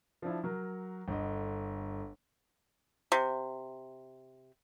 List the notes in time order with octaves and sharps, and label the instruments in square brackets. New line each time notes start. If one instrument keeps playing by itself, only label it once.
[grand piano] F3 D4 E4
F#3 A#4
G1 D3 D#5
[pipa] C3